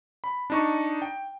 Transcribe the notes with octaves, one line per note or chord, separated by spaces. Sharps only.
B5
D4 D#4 C#6
G5